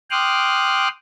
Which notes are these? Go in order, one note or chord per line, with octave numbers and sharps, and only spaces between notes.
G5 C6 D6 D#6 F6 F#6